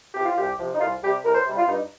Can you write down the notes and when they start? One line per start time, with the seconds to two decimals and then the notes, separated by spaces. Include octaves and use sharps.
0.14 C3 F3 G4
0.25 F4
0.37 C2 G4
0.58 C3 F3
0.74 D#4
0.80 C2 F4
1.02 G3 G4
1.06 C3
1.24 C2 A#4
1.35 C5
1.46 C3 G3
1.56 F4
1.67 G2 D#4